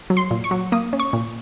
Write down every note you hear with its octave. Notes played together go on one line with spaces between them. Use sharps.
F#3
C6
A#2
C#6
F#3
A#3 D#6
C#4
C#6
A#2